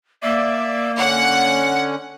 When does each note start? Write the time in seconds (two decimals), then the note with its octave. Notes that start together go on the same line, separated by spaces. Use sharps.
0.23 A#3 D5 E5
0.98 D3 C#4 F#5